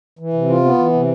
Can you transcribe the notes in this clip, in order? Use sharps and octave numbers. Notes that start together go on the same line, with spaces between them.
E3
C3
F4
B3
E3
C3